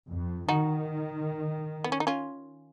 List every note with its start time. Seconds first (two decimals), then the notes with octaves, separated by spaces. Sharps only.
0.08 F2
0.49 D#3 D#4 F#4
1.84 B3
1.92 C#4
2.00 D#4
2.07 C#4 F4